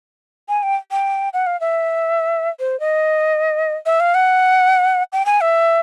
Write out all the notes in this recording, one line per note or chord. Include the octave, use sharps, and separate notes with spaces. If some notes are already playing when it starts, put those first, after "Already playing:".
G#5
G5
G5
F#5
F5
E5
C5
D#5
E5
F5
F#5
G5
G#5
E5